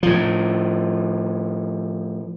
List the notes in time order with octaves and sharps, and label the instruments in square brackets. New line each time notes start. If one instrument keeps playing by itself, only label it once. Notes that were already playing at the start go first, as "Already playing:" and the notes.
[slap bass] A2 F3